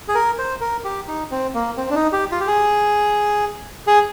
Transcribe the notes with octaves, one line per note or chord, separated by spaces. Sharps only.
G#4
A#4
C5
A#4
G4
D#4
C4
A#3
C4
D4
D#4
G4
F4
G4
G#4
G#4